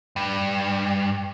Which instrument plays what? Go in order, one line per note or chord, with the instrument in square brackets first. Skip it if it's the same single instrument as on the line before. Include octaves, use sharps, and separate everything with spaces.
[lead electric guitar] G2